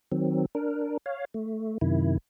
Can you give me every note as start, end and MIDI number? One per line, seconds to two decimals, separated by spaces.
0.12 0.46 51
0.12 0.46 54
0.12 0.46 60
0.55 0.97 62
0.55 0.97 70
1.06 1.25 73
1.06 1.25 77
1.34 1.78 57
1.81 2.18 42
1.81 2.18 48
1.81 2.18 51
1.81 2.18 64